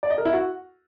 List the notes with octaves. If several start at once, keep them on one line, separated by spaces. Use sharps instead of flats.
D5
D#5
A#4
E4
F#4